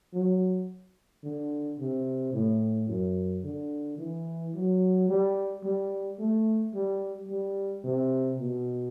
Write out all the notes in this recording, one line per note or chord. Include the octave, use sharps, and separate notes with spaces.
F#3
D3
C3
A2
F#2
D3
E3
F#3
G3
G3
A3
G3
G3
C3
B2